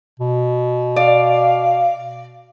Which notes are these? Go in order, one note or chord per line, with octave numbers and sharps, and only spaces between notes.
B2
D5 F5